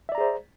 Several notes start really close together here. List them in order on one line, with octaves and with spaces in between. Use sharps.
E5 D5 A#5 G#4 C5